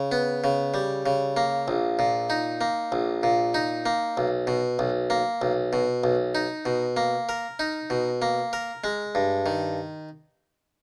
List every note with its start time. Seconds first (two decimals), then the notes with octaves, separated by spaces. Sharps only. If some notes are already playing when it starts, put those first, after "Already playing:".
Already playing: C#3
0.12 B3
0.44 C#3
0.74 G3
1.06 C#3
1.37 A#3
1.68 A#1
1.99 A#2
2.30 D#4
2.61 A#3
2.92 A#1
3.23 A#2
3.54 D#4
3.86 A#3
4.17 B1
4.47 B2
4.79 B1
5.10 A#3
5.42 B1
5.73 B2
6.04 B1
6.35 D#4
6.65 B2
6.97 A#3
7.29 A#4
7.59 D#4
7.90 B2
8.22 A#3
8.53 A#4
8.84 G#3
9.15 G2
9.46 D#3